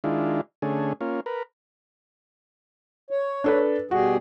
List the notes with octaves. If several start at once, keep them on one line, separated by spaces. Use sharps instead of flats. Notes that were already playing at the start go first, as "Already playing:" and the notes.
D#3 G#3 D4 E4 F4
D3 A3 C#4 G#4
A#3 C#4 F4
A#4 B4
C#5
D4 A4 B4
B2 G3 F#4 G#4